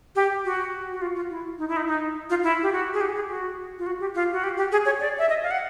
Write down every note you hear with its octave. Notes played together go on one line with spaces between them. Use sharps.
G4
F#4
F#4
F4
F4
E4
D#4
E4
D#4
D#4
F4
E4
G4
F#4
G#4
G4
G#4
F#4
F4
F#4
G4
F4
F#4
G4
G4
G#4
C#5
D5
E5
D#5
F5
F#5